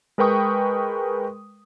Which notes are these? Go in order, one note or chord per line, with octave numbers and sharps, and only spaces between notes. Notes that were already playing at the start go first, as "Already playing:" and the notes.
G#3 A#4 B4 G5 C#6 D#6